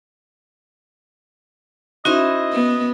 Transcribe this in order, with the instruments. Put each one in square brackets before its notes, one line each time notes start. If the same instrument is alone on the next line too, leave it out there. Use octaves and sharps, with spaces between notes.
[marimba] C#4 F#4 [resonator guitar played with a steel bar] D#4 E4 C5 [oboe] D#5
[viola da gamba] B3